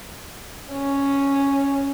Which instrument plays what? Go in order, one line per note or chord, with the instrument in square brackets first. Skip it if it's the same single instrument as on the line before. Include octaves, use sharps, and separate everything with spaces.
[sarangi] C#4